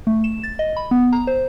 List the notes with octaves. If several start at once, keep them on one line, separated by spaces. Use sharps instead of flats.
A3
E7
A6
D#5
B5
B3
A#5
C5